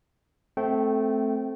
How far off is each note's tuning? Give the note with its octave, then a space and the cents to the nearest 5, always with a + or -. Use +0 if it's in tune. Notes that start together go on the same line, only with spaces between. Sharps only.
A3 -5 C4 +0 G5 -25